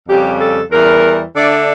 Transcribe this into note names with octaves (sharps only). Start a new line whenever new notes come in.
F2 C#3 G3 G4
A4
E2 E3 G3 A#4
D3 A3 D4 D5